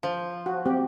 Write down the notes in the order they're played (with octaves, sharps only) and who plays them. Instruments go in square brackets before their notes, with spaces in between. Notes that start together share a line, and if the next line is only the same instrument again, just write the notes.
[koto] F3
[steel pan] F#4
[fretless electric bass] C4 [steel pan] G4